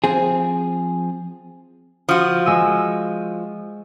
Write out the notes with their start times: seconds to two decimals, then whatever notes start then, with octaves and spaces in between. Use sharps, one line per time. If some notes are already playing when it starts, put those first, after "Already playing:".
0.04 F3 C4 G#4
2.09 F3 F#4 D#6
2.46 G#3 E6 D#7